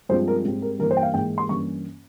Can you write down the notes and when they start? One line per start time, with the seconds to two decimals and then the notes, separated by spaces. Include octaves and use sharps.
0.09 G2 F3 G#3 C4 C5
0.28 A#4
0.45 G#2 G3 C4
0.62 A#4
0.79 G2 E3 G3 A#3 A#4
0.91 C5
0.97 G5
1.03 F5
1.14 G#2 E3 A#3 G5
1.38 C6
1.49 G2 E3 A#3 C#4 C#6